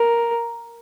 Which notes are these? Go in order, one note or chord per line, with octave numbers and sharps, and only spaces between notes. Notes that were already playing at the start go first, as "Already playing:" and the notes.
Already playing: A#4